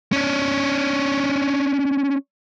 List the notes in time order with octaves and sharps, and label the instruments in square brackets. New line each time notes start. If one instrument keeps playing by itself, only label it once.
[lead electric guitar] C#4 D4